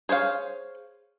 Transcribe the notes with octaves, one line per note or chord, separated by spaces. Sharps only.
G#4 C5 C#5 F5